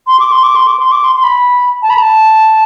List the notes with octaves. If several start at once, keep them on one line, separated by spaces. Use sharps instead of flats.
C6
D6
C6
D6
C6
D6
C6
D6
C6
C6
B5
A5
B5
A5